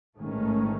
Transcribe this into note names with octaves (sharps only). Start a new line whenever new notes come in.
A1 G#2 D#3 A3 C#4